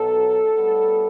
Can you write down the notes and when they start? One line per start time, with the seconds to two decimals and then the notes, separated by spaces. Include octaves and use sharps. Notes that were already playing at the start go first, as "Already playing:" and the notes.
Already playing: B1 B2 F#3 A4
0.58 A2 G3 B3